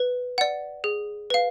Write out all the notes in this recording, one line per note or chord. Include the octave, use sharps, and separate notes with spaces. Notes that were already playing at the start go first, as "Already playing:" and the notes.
Already playing: B4
D5 F#5
G#4
B4 F5